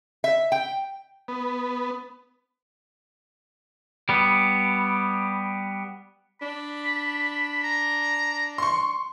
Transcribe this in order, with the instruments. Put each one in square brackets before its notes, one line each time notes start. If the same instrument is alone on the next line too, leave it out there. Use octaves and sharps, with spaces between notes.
[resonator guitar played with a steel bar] E5
G5
[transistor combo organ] B3
[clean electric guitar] G3 B3
[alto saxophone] D4 [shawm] B5
[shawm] A#5
[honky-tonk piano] C6 C#6